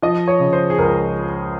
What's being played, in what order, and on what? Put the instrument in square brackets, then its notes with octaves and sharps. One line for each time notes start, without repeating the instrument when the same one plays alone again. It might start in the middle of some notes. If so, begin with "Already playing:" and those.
[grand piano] F3 D#5
C#5
C#3
C5
G#4
C#2 A#4